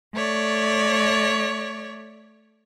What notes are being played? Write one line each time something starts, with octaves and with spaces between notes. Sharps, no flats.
A3 C#5 D5